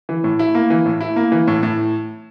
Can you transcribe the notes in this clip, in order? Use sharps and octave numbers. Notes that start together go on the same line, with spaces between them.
E3
A2
E4
A#3
E3
A2
E4
A#3
E3
A2
A2